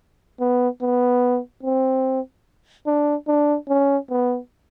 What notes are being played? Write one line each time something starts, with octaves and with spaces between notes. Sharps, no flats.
B3
B3
C4
D4
D4
C#4
B3